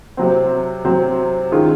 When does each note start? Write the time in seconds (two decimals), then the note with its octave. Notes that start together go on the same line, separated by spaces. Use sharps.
0.17 C3 F#3 C4
0.84 C3 F#3 C4
1.51 D#3 G#3 C#4 F4 G#4